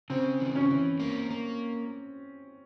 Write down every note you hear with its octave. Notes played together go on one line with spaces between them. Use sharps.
C#3 C4
E3
C#4
E3
A#3
A#3